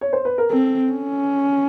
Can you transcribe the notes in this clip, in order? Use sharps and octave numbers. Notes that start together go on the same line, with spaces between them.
C#5
C5
B4
A#4
C4 A4
C#4